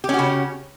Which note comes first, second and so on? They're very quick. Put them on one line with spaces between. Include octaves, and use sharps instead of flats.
G4 C#4 F#4 C#3